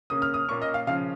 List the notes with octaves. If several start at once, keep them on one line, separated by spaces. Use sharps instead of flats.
C#3 A#3 C#4 D#6
F6
D#6
A#2 A#3 C#4 C#6
D#5
F5
C#3 F3 C#4 F5